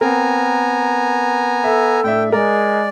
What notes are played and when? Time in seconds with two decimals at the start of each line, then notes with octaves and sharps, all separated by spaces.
0.01 B3 C4 A#4 G#5 A#5
1.64 A4 E5
2.04 A2 D4 E5 G5
2.32 G#3 A#4 D5